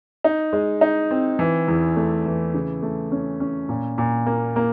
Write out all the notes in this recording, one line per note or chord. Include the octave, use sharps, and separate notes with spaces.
D#4
G#3
D#4
C4
E3
E2
A3
E3
C#3
A3
C#4
C#4
A#2
A#2
A#3
A#3